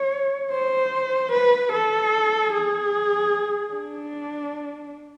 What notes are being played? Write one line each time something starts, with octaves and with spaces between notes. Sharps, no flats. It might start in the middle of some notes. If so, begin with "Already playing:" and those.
Already playing: C#5
C5
B4
A4
G#4
D4